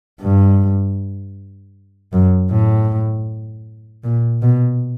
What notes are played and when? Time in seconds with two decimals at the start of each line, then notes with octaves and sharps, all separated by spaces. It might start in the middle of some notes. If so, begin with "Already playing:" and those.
0.21 G2
2.13 F#2
2.51 A2
4.04 A#2
4.42 B2